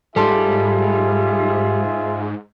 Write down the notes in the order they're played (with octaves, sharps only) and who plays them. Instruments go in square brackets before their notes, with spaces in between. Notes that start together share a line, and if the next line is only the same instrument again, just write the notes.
[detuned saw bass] G#2 [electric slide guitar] G3 [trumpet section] F4 G#4 E5 [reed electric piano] A4 A5 C6